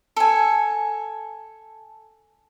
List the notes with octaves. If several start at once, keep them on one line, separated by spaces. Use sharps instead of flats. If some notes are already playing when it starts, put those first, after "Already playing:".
A4 G#5